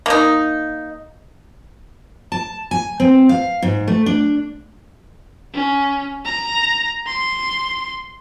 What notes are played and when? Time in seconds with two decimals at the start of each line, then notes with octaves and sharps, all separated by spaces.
0.06 A#3 D#4
2.32 A5
2.71 G#5
3.00 C4
3.29 F5
3.62 G#2
3.88 A3
4.06 D4
5.54 C#4
6.25 A#5
7.06 C6